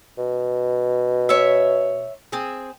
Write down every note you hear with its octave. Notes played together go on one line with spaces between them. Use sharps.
B2
C#5 E5
C4 G#4